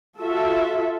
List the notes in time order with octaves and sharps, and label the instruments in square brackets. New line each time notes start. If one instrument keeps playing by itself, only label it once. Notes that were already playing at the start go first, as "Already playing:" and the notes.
[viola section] F4 F#4 A4 E5